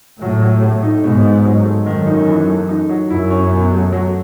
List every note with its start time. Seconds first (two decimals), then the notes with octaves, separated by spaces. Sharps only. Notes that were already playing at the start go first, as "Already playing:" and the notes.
0.21 A2 F#3
0.42 F#3
0.63 A3
0.83 D#4
1.03 G#2 B2
1.25 B3
1.45 F#3
1.66 A3
1.86 F#2 D#3
2.07 D#4
2.28 E3
2.48 A3
2.69 D#4
2.89 F#3
3.10 F#2 E4
3.31 C#4
3.51 B2
3.72 A3
3.92 F#3